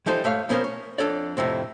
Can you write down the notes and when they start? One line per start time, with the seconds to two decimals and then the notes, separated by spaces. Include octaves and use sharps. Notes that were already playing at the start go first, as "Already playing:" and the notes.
0.06 E3 F3 G3 D#4 A4 C5
0.24 G#2 A3 C#5 F5
0.49 F3 B3 C#4 G4 A#4 C5
0.64 C#5
0.98 F2 C#4 D4 A4 C#5 D5
1.37 F2 A2 C3 C4